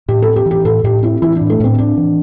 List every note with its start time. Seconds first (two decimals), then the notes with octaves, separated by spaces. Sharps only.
0.08 A2 G4
0.22 A4
0.28 C4
0.36 G4
0.46 E3
0.51 G4
0.65 A2 A4
0.84 A2 G4
1.03 C4 E4
1.22 E3 E4
1.36 D4
1.41 A2
1.50 A3
1.60 A2 C4
1.78 C4 D4
1.97 E3